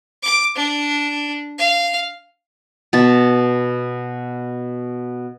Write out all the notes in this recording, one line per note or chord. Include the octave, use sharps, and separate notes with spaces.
D6
D4
F5
B2 A5 B5